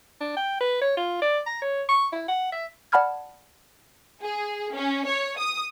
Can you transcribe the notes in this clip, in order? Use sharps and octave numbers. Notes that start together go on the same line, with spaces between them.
D4
G5
B4
C#5
F4
D5
A#5
C#5
C#6
E4
F#5
E5
D5 F#5 A5 B5 F6 G#6
G#4
C#4
C#5
D#6